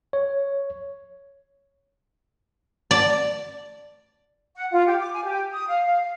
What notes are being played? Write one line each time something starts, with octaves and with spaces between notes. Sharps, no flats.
C#5
D5
F#5
F4
G4
D6
G#5
G4
D#6
F5
F5
F5